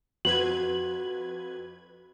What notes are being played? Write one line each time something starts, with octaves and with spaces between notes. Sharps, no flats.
F2 F#4 B4 G#6 F#7